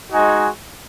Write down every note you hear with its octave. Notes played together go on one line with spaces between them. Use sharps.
G#3 D#4 F#4 G#5